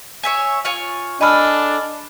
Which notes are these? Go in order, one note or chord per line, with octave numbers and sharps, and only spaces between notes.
C#5 E5 G#5
F4 C#5 G#5
D4 G#4 A4 D#5 B5 F6